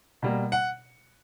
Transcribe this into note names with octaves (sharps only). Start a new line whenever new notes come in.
B2 G3 A#3
F#5